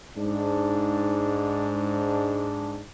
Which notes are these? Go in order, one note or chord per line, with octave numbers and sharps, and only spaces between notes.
G#2 D4